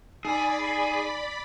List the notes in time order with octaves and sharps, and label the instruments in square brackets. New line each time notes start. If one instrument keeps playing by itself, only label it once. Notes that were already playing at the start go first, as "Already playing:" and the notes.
[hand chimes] D#4 G#5 [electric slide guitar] G#4 [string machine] D5 B5